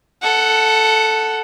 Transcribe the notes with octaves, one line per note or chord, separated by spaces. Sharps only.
A4 F#5